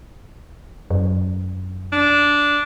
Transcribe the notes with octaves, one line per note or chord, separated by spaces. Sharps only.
F#2
D4